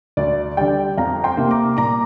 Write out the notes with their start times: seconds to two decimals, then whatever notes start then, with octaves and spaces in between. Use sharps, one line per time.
0.17 D2 D5
0.57 D3 G3 D5 G5
0.97 F2 F5 A#5
1.24 G5 C6
1.37 C3 A#3
1.51 A#5 D6
1.77 A#2 A#5 D6